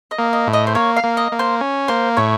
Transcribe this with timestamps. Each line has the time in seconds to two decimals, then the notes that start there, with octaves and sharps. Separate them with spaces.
0.11 D#5
0.19 A#3
0.33 D#5
0.47 A2
0.53 D#5
0.67 C5
0.75 A#3 C#5
0.96 F5
1.04 A#3
1.17 D#5
1.32 A#3
1.39 C5
1.61 C#4
1.88 A#3 C5
2.17 A2 C#5